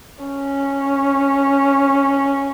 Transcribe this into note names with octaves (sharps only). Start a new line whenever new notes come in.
C#4